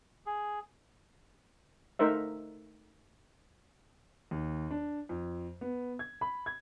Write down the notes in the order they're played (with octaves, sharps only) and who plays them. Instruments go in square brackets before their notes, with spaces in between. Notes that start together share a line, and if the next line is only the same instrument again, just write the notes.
[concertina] G#4
[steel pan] A3 D#4 A#4 C5 E5
[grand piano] D#2
D4
F2
B3
G#6
B5
G#6